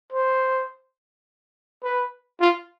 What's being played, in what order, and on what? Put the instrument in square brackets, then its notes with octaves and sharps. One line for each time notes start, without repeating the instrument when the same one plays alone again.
[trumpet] C5
B4
F4